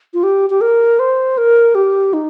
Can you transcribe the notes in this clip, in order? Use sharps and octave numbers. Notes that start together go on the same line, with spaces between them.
F4
G4
G4
A#4
C5
A#4
G4
D#4